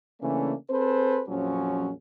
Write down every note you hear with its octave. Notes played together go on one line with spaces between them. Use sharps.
C#3 E3 A3 A#3 C#4 D4
C4 G#4 A4 B4 C5
A#1 F2 F3 F#3 C#4